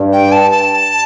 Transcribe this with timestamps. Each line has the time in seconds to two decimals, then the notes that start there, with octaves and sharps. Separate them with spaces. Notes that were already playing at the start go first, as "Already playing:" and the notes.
Already playing: G2
0.13 G5
0.32 A5
0.51 A5